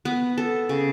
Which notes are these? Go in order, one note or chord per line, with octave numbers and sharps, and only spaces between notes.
B3
A4
C#3